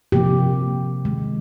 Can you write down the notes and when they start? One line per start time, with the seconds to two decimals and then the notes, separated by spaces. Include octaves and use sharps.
0.12 C3 F3 A#3 G4
1.05 D#3 G#3